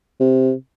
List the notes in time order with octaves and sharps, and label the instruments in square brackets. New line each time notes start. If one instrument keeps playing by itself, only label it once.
[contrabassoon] C3